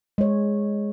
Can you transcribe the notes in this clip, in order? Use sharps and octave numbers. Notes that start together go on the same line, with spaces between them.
G#3 C#5